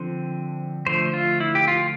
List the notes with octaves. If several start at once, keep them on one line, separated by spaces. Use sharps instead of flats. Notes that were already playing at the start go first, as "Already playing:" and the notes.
Already playing: D3 F3 C4
D3 F3 A3 C5
F4
E4
G4
F4